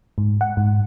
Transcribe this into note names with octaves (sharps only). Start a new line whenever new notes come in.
G#2
F#5
G#2